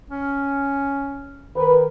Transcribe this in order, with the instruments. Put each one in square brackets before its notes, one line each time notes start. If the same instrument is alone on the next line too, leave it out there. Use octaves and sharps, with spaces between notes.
[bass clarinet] C#4
[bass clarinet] D#3 [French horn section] B4